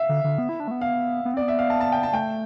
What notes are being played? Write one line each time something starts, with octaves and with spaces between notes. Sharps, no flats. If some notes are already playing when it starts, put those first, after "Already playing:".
Already playing: E5 F5
D3
D3
B3
E4
D4
A3
B3
F5
B3
C4 D5
B3
E5
F5
A5
A5
G5
A5
A3 G5